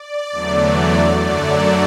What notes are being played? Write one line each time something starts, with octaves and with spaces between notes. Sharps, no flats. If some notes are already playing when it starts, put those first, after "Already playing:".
Already playing: D5
E2 D3 F#3 A3
F#2 D3 F#3 A3 D5